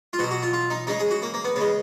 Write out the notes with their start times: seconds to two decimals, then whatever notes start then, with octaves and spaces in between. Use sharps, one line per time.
0.13 F4
0.19 B2 F#4
0.23 F#3
0.31 F#4
0.43 F4
0.53 F4
0.70 D#4
0.87 C#3 G#3 D#4
1.00 G#4
1.11 F#4
1.22 A#3
1.34 A#3
1.45 B3
1.56 C#3 G#3 B3